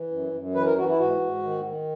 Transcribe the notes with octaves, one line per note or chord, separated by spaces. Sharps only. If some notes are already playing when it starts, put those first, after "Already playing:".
Already playing: E3
F#2
F#2
E3 B4
A#4
E3 F#4
E4
G#2 F#4
G#2
D#3
D#3